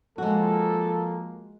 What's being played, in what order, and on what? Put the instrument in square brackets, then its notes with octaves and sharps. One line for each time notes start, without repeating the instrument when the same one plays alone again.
[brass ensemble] F3 A#3 [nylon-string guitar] G#3 F#4 [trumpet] A4